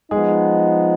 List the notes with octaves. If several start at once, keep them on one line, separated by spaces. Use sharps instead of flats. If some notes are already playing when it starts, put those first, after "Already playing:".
F3 G#3 B3 D#4 G#4